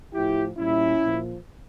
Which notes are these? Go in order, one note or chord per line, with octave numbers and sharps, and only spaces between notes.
A2 F3 E4 G4
A#2 G3 C#4 E4
A#2 F3